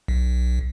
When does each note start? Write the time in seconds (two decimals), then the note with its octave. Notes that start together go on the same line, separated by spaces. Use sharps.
0.08 B1